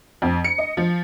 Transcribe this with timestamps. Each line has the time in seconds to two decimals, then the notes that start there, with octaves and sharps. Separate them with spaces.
0.22 F2
0.44 C#7
0.58 D#5
0.77 F3